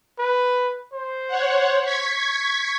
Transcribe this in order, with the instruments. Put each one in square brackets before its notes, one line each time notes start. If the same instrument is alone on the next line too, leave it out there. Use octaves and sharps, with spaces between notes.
[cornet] B4
C5
[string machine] C#5 F#5
C#6 G#6 B6